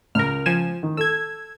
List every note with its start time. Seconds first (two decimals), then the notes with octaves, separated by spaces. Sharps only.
0.15 C#2 A#4 F6
0.46 F3 G#5 E7
0.83 D#3
0.97 A4 E6 G#6